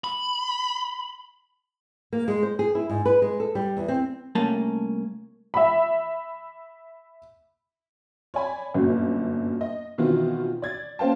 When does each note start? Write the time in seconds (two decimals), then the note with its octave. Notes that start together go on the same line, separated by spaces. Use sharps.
0.04 B5
2.13 A#3
2.28 G#3
2.43 C5
2.59 G#4
2.75 E4
2.90 G#2
3.05 B4
3.22 G#3
3.40 A4
3.55 G3
3.77 E2
3.88 C4
4.35 C2 A3 A#3 C#4 A5
5.54 E5 B5
8.34 C#5 D5 G#5 B5
8.74 G1 F#2 A#2 F#3
9.61 D#5
9.98 B2 D#3 E3 C4 F4 F#4
10.62 D5 G#6 A6
10.99 A#3 C#4 C5 F5 G5 A5